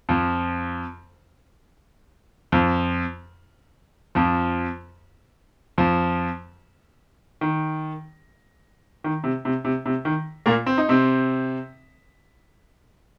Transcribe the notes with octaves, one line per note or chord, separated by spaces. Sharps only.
F2 F3
F2 F3
F2 F3
F2 F3
D#3
D#3
C3
C3
C3
C3
D#3
A#2 A#3
C4
D#4
C3 C4